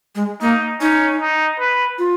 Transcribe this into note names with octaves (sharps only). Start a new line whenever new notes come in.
G#3
A#3 D#4
C#4 D#4
D#4
B4
F4